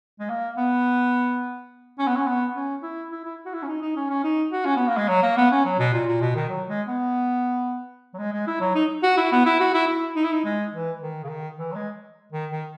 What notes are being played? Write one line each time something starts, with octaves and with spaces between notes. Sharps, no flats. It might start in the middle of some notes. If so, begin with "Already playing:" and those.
G#3
A#3
B3
C#4
B3
C#4
B3
C#4
E4
E4
E4
F#4
E4
C#4
D#4
D#4
C#4
C#4
D#4
F#4
C#4
B3
A#3
G#3
F#3
A#3
B3
C#4
F#3
B2
A#2
A#2
B2
D#3
F#3
G#3
B3
F#3
G#3
G#3
E4
F#3
D#4
F#4
E4
B3
E4
F#4
E4
E4
D#4
E4
D#4
G#3
E3
D#3
C#3
D#3
E3
F#3
G#3
D#3
D#3